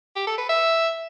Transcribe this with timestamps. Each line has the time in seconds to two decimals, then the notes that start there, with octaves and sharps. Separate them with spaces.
0.16 G4
0.27 A4
0.38 B4
0.49 E5